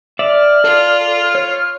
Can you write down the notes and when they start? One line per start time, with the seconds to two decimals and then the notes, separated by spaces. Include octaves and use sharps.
0.19 D5 E5 F6
0.64 F4 A4
1.35 C#5